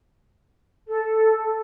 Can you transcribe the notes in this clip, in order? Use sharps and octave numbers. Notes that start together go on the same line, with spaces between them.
A4